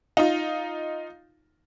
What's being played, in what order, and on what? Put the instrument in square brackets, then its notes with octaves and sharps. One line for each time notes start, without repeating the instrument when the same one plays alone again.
[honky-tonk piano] D#4 F4